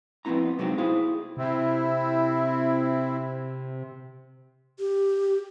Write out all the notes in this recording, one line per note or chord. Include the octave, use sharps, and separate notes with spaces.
F2 B3 C4 E4 A#5
C3 F#3 G#3 C4 D#4
E4 G#4 C5 F5
C3 C4 E4
G4